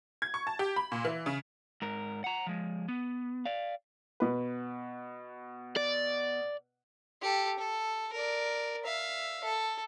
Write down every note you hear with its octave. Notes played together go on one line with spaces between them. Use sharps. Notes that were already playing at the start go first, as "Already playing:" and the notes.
G#6
C#6
A5
G4
B5
A#2
E3
C#3
G#2 A#4
F#5 A#5
F3 G#3
B3
D5 F5
B2 B4
D5
G4 A4
A4
A#4 D5
E5 F5
A4